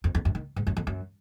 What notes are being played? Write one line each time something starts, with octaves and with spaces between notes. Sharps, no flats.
F2
F2
F#2
D#3
G#2
F#2
F2
F#2